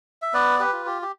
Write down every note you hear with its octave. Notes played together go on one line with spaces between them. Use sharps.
E5
B3 B4 D5
G4 B4
F4
G4
G4